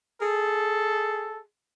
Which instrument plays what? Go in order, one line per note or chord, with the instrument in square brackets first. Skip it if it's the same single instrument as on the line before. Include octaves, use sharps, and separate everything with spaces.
[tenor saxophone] G#4 [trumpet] A4